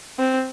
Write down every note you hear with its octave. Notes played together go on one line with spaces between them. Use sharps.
C4